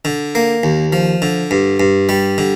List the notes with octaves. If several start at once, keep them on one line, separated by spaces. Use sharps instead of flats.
D3
A#3
D#2
F3
D3
G2
G2
G3
D3